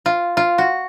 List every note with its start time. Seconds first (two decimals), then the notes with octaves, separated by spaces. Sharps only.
0.06 F4
0.37 F4
0.58 F#4